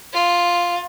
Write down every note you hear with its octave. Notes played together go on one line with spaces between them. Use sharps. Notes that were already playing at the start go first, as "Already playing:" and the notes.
F4